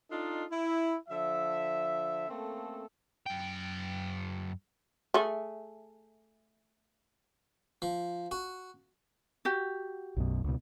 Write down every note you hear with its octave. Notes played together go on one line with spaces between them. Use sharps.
D4 D#4 F4 A4 D#5
E4
D3 F3 E5
A3 A#3 C4 C#4 A4
F#2 G5
A3 G#4
F3
F#4
F#4 G4
B1 F#2 B2
C#2 B2